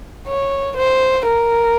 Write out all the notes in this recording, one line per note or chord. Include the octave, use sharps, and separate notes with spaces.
C#5
C5
A#4